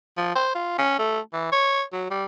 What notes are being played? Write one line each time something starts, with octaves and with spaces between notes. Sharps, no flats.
F3
C5
F4
C#4
A3
E3
C#5
F#3
G3